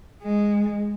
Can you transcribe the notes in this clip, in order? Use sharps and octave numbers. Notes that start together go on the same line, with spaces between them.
G#3